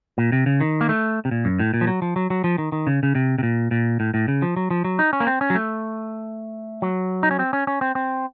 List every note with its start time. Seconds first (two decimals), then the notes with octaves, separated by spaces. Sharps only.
0.18 A#2
0.32 C3
0.46 C#3
0.61 D#3
0.81 A#3
0.89 A3
1.25 C3
1.31 A#2
1.45 F#2
1.59 A2
1.74 A#2
1.81 F3
1.87 F#3
2.02 F3
2.16 F#3
2.30 F#3
2.44 F3
2.58 D#3
2.72 D#3
2.87 C#3
3.03 C#3
3.15 C3
3.38 C3
3.43 A#2
3.71 A#2
4.00 A2
4.14 A2
4.28 C#3
4.42 F3
4.57 F#3
4.71 F3
4.84 F#3
4.99 D#4
5.13 C#4
5.20 A#3
5.27 C4
5.41 C#4
5.50 F#3
5.55 A3
6.82 F#3
7.23 D#4
7.31 C#4
7.39 C4
7.53 C#4
7.67 C#4
7.81 C4
7.95 C4